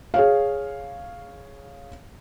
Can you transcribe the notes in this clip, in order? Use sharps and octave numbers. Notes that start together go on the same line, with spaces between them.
G#4 C#5 F5